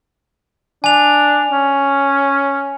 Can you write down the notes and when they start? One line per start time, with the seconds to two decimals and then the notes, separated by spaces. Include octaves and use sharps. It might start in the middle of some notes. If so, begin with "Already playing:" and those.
0.84 D4 G#5 F7
1.50 C#4